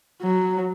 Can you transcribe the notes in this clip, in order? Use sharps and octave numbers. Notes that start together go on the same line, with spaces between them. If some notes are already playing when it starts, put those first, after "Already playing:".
F#3